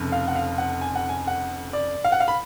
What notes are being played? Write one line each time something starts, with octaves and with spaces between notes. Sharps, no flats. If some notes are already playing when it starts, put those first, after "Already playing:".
Already playing: F1 F2 C#3
F5
F#5
F5
F#5
G#5
F#5
G#5
F#5
D5
F5
F#5
F5
B5